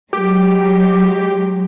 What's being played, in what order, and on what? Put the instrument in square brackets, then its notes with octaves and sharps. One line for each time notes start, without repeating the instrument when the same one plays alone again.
[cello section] F#3 G#3 [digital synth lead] G4